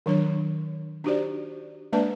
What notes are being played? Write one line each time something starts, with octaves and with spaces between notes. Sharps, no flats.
D#3 F#3 D4 C#5
D4 D#4 F#4 G4 C5 D5
G#3 A#3 D4 B4 D5 A5